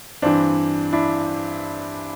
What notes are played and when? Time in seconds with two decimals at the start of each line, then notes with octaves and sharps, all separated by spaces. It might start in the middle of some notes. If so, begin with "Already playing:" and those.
0.22 G2 E3 C4 D4
0.93 D4 E4